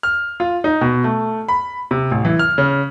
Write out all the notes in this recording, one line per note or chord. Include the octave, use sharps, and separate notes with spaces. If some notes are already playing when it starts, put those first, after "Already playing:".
F6
F4
D#4
B2
A3
B5
C3
A1
E3
F6
C#3